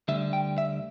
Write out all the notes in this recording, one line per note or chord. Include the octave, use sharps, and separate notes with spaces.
D2 D3 G3 E5
G5
E5